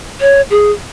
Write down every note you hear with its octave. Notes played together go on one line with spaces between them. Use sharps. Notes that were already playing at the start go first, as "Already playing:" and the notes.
C#5
G#4